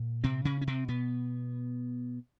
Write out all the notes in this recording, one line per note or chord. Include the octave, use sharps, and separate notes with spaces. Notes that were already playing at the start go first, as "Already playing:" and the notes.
Already playing: A#2
C3 C4
C#3 C#4
C#4
C3 C4
B2 B3